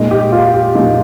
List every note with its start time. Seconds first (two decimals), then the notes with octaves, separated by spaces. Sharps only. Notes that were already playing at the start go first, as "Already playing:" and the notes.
Already playing: A#2 G#3 D#4 D#5
0.11 G4
0.32 F4
0.54 G4
0.75 A#2 G#3 D#4